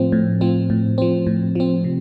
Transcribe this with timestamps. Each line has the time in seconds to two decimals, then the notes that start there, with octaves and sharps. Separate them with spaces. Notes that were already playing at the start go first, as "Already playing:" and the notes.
Already playing: A2 F3 C4
0.12 A2
0.41 F3 C4
0.70 A2
0.98 F3 C4
1.27 A2
1.55 F3 C4
1.84 C3